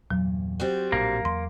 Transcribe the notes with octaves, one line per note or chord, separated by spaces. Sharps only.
E2 G2 A#2 F#3
G3 C4 F#4
A#1 A2 A#3 D4
E2 F#3 C6